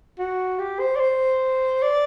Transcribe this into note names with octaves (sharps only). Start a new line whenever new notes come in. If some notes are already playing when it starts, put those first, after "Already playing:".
F#4
G4
C5
D5
C5
D5